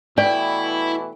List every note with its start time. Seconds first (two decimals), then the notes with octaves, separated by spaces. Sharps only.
0.18 B2 E3 A3 E4 D5 G5